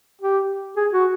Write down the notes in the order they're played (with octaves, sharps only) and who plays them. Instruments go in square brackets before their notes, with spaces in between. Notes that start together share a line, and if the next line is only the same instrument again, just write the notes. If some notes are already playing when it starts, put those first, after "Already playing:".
[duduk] G4
G#4
F#4